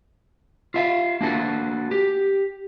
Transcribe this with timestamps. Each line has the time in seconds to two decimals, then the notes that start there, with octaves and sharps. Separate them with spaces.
0.74 F4 E5 F5
1.21 A#3 D4 F#4 A4
1.91 G4